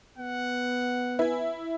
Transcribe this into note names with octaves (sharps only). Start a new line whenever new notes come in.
B3 F#5
E4 B4 G#5